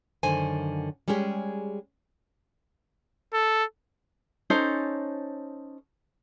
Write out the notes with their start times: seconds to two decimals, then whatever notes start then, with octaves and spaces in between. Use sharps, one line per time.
0.23 F#2 D3 D#3 C5 G#5
1.08 G3 G#3 C#4 G4 G#4
3.34 A4
4.50 C#4 D#4 A4 C5